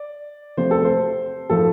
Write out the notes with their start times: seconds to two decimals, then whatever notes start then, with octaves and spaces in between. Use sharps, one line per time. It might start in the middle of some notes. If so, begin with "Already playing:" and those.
Already playing: D5
0.57 C3 F3 A3 C5
0.71 A4
0.84 C5
1.50 A2 F3 A3 A4